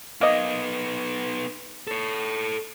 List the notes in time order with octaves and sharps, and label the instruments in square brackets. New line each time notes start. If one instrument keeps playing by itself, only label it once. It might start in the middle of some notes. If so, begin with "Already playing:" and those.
[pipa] A#3 D#5 [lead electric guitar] B3 D#4
[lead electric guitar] A4 C#5